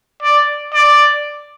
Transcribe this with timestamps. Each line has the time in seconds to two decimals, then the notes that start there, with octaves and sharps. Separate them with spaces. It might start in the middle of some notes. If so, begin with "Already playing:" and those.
0.22 D5
0.74 D5